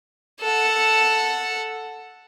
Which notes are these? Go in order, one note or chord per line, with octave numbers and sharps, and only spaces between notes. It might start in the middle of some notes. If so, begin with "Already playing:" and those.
A4 F#5